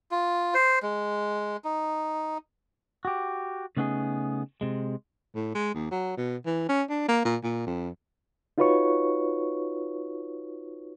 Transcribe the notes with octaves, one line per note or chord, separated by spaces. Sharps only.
F4
C5
G#3
D#4
F#4 G4
C#3 A3 B3 C#4 D#4 G#4
C3 G#3
A2
G#3
D#2
F#3
B2
E3
C#4
D4
A#3
A#2
A#2
F2
D#4 F4 F#4 B4 C#5 C#6